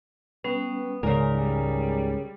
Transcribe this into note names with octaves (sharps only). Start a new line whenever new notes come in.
G3 B3 C#4
C#2 G#2 C#3 A#4 D5 G#5 A#5
G3